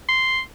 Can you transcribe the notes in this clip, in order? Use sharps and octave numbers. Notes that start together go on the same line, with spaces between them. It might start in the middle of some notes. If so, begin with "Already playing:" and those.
C6